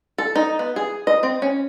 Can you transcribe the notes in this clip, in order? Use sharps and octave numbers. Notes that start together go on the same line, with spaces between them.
A4
D#4
B3
G#4
D#5
C4
C#4